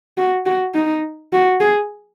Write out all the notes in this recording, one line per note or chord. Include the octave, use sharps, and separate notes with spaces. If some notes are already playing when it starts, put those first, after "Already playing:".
F#4
F#4
D#4
F#4
G#4